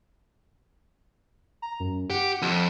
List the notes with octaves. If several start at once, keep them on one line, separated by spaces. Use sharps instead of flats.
A#5
F#2
G4 F#5
F2